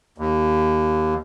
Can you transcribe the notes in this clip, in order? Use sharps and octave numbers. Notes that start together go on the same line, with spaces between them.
D#2